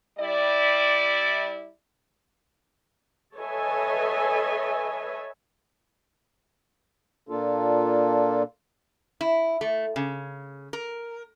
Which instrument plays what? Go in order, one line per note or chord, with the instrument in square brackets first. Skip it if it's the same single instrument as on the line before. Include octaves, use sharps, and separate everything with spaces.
[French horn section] G3 E4 D5
[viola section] A4 B4 C#5 D#5 E5 G#5
[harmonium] A#2 A#3 D4 F4 A4
[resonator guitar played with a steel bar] E4
A3
C#3
A#4